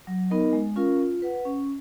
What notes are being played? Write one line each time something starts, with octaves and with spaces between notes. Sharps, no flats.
F#3
B3 D#4 A#4 D#5
G#3
C#4 F4 A#4 F5
F4
B4 F#5
C#4